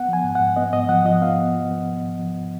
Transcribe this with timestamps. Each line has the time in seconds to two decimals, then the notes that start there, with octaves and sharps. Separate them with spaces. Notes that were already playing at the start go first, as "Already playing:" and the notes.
Already playing: B3 F#5
0.08 F3 G#5
0.24 G#2
0.35 G#2 F#5
0.56 B3 D#5
0.73 G#2 D#5
0.89 F3 F#5
1.05 F3 D#5
1.21 B3 F5
1.39 G#2
1.55 F3
1.71 B3
1.86 B3
2.03 G#2
2.19 F3